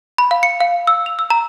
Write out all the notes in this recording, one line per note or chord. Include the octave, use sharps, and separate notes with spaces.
B5
F5
C#7
F5
E6
F7
E6
A#5